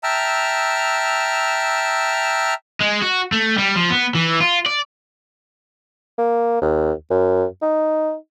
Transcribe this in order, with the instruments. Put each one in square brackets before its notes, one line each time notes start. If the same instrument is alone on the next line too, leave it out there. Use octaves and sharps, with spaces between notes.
[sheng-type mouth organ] E5 G5 A5 A#5 E6 F6
[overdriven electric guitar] G#3
F#4
A3
G3
F3
B3
E3
F4
D5
[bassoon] A#3
D#2
F#2
D#4